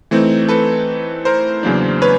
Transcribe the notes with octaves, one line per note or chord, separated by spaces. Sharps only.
E3 A3 C4 D#4
A4 B4
A#4 C5
E2 C#3 F#3 A#3 D4
B4 C#5